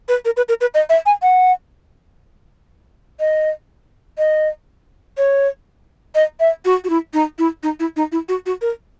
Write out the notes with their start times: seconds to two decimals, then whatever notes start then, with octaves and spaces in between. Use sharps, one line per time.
0.09 B4
0.25 A#4
0.37 B4
0.49 A#4
0.61 B4
0.74 D#5
0.90 E5
1.06 G#5
1.22 F#5
3.20 D#5
4.18 D#5
5.18 C#5
6.15 D#5
6.40 E5
6.65 F#4
6.84 F#4
6.90 E4
7.14 D#4
7.39 E4
7.63 D#4
7.80 E4
7.96 D#4
8.12 E4
8.29 F#4
8.46 F#4
8.61 A#4